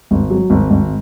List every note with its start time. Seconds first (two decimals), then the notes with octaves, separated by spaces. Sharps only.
0.11 G#1
0.30 F#3
0.50 G#1
0.70 G#1